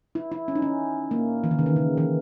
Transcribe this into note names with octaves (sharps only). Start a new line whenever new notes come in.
E4
E4
C#4
D#4
C#4
A#3
E3
D#3
C#3
D#3
C#3
E3